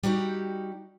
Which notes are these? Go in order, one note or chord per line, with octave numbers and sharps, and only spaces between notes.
G3 D#4 F#4 G4